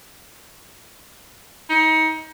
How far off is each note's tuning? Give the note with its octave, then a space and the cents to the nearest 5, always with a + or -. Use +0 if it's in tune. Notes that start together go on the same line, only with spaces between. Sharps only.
D#4 +30